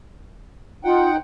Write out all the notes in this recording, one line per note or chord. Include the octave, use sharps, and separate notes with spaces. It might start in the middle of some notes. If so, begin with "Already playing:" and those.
D#4 F4 F#5 G5